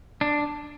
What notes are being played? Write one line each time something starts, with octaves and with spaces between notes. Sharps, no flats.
D4